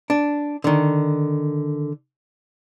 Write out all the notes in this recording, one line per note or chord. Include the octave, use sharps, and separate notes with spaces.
D4
D3 D#3